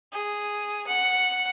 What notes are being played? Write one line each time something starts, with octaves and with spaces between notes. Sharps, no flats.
G#4
F#5